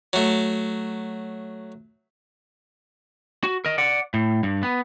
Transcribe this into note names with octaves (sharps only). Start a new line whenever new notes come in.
F#3 A3
F#4
A#4 D#5
D5 F#5
A2
G2
B3